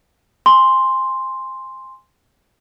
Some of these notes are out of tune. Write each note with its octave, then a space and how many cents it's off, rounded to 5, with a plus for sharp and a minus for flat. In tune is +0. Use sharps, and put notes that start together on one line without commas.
G#5 -15 C6 +0